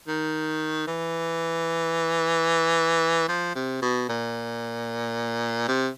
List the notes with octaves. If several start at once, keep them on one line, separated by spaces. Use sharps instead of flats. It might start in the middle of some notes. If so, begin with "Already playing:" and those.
D#3
E3
F3
C3
B2
A#2
C3